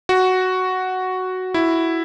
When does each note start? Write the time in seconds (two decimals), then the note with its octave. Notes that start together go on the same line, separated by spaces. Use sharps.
0.09 F#4
1.54 E4